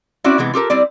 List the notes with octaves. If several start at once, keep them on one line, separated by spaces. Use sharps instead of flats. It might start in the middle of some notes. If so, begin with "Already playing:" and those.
C4 C#4 E4 F#4 D5
C3 E3 G#3 B3
F4 G4 A4 A#4
G3 C4 E4 D5